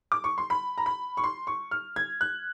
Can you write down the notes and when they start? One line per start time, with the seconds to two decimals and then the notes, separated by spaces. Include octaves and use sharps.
0.12 D6
0.24 C#6
0.38 C6
0.50 B5
0.78 A#5
0.86 B5
1.17 C#6
1.24 C6
1.47 C#6
1.71 F6
1.96 G#6
2.21 F#6